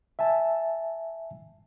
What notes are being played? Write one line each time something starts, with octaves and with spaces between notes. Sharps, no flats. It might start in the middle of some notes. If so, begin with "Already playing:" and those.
E5 G#5 A5